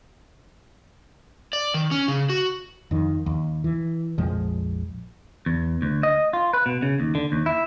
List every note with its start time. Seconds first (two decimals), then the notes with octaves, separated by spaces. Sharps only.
1.53 D5
1.74 D#3
1.91 C#4
2.08 C#3
2.30 F#4
2.91 F2 D#3
3.26 D#2
3.64 E3
4.18 A#1 F2 F3 G#3
5.46 E2
5.82 D2
6.03 D#5
6.33 F4
6.53 B4
6.66 B2
6.82 C#3
7.00 D#2
7.15 D3
7.32 D#2
7.46 E4